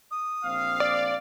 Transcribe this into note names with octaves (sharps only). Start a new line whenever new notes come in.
D#6
A#1 C4 F5
D5